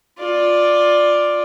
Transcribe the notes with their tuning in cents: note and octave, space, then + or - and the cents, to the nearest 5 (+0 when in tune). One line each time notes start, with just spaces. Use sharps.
F4 +15 D5 +5